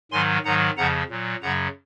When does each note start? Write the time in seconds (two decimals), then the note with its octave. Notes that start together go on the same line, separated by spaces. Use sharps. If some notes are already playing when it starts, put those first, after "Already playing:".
0.12 G#2 D#3 F#3 G#5 C6
0.44 G#2 D#3 F#3 F#5 A#5
0.77 F2 C#3 F3 F#5 A#5
1.09 A#2 F#3
1.42 F#2 C#3 F#3 F#5 A#5